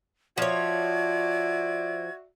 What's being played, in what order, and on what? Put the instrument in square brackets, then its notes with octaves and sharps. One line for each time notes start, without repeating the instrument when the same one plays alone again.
[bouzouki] F3 C#5 [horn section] F#4 D5 E5 [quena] G#6